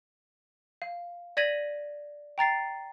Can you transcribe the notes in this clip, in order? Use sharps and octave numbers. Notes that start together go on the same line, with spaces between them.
F5
D5 G#6 A#6 B6 D#7 F#7
G5 A#5 A6 C7